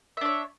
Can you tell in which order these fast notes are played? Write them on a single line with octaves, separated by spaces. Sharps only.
E5 D4 C#5